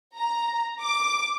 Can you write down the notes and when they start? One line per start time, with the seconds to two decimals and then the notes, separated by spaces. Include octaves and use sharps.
0.17 A#5
0.82 D6